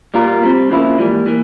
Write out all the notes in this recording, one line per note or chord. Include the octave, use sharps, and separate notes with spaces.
A#2 G3 A#3 F4 A#4
G2 G3 C4
F2 C#3 F3 A#3 E4
G#2 E3 G3 A#3
E3 A#3